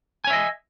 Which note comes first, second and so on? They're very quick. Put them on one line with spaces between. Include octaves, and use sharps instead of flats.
G#5 C#5 E5 D#5